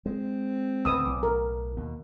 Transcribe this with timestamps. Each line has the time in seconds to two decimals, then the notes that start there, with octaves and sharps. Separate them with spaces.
0.06 G#3 C4
0.85 D2 A2 C#3 B4 D#6 E6
1.05 B1 A2 D6
1.23 A#4
1.76 D#2 B2